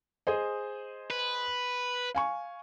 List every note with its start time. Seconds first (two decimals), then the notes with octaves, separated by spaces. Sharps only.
0.27 G#4 C5 D#5
1.10 B4
2.15 F5 G#5 C#6